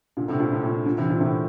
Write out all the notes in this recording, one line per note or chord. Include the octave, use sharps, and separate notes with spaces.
A#2 D3
A2 C3
A#2
A2
A#2
A#2 D3
C3 E3
A#2 D3
A2 C3